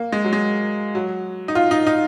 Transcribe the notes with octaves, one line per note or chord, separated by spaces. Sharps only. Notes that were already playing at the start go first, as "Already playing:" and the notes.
Already playing: A#3
G#3
F#3
G#3
F#3
D#4
F4
D#4
D#4